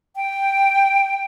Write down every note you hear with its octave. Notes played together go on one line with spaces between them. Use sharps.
G5